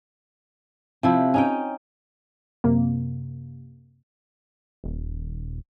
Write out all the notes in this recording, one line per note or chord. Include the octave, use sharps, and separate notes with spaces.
C3 F3 E4
C#4 D#4 G5
F#2 C3 A#3
D#1